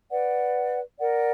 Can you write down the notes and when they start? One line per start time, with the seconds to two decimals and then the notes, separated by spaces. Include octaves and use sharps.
0.10 B4 D5 F#5
0.99 A#4 D5 F#5